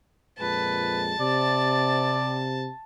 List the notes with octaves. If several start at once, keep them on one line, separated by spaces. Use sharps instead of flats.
F2 A#2 G#3 B4 A5
C3 D5